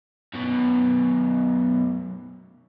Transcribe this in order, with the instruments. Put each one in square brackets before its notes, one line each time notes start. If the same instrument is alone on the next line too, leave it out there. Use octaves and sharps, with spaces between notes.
[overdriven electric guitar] F#2 B2